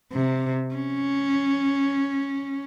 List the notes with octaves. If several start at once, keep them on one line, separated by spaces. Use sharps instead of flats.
C3
C#4